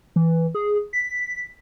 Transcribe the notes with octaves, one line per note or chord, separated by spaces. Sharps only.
E3
G#4
B6